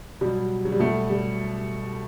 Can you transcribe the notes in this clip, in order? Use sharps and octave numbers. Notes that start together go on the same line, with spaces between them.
B2 F#3 G3
F#3
G3
B2 F#3 A3
G3